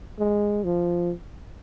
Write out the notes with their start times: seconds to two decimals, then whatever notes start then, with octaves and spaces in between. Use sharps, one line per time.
0.19 G#3
0.64 F3